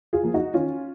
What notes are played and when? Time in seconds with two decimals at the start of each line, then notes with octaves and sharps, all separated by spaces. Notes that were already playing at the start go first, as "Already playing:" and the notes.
0.13 F4 G#4
0.23 F3 A#3
0.34 D#4 F#4
0.54 D#3 C#4 F4